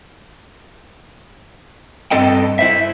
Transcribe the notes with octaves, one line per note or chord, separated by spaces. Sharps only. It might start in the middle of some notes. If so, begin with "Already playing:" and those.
G2 C4 A4 D#5 G5
E4 C5 E5